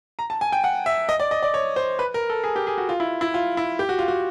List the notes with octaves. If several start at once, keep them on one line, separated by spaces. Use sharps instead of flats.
A#5
A5
G#5
G5
F#5
E5
D#5
D5
D#5
D5
C#5
C5
B4
A#4
A4
G#4
G4
G#4
F#4
F4
E4
E4
F4
E4
G4
F#4
F4
F#4